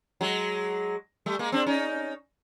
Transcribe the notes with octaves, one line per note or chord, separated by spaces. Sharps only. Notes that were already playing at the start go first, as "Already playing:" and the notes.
F#3 G#3
G3 A3
G#3 A#3
C4 D4
C#4 D#4